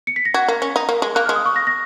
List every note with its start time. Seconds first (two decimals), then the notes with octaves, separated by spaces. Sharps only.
0.07 C#7
0.16 B6
0.25 A#6
0.34 F#4 G#6
0.48 A#3
0.62 C#4
0.76 D#4
0.89 A#3
1.02 G#3
1.15 A#3 F#6
1.25 F6
1.29 G#3
1.36 D#6
1.46 C#6
1.56 A#6
1.67 A#6